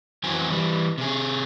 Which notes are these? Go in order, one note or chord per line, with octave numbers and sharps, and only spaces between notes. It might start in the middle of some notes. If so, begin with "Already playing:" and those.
F2 E3 C4 F#4 G#5
E3 G3
C3 G#4